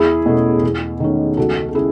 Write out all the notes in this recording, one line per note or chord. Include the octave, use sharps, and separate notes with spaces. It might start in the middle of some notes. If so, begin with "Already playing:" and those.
Already playing: E2 E4 G#4
B2 A3 C#4
E2
D#3 A3 C#4
C#2 F#4 A4
A4
C#3 E4 G#4